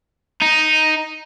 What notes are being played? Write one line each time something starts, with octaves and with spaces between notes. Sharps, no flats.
D#4